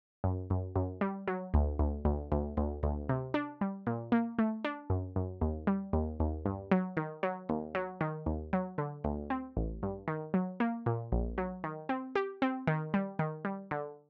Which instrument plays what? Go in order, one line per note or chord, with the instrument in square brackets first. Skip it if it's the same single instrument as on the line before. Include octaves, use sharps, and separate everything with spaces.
[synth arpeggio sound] F#2
F#2
F#2
G3
F#3
D2
D2
D2
D2
D2
D2
C3
D4
G3
A#2
A#3
A3
D4
F#2
F#2
D#2
G3
D#2
D#2
G2
F#3
D#3
F#3
D#2
F#3
D#3
D#2
F#3
D3
D2
C4
A1
G2
D#3
F#3
A#3
A#2
A#1
F#3
D#3
C4
G4
C4
D#3
G3
D#3
G3
D3